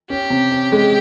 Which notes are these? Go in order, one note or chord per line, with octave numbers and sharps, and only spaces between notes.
C#4 G4
C3
C#4
G#3